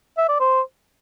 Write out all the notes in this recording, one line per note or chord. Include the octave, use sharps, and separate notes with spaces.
E5
D5
C5